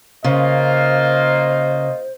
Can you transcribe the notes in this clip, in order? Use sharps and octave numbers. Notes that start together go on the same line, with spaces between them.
C#3 A#3 F4 C5 D#5